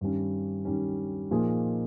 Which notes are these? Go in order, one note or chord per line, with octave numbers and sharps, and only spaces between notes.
G2 D#3 G3 C#4
G2 D#3 G3 C#4
A#2 F3 A#3 D#4 G#4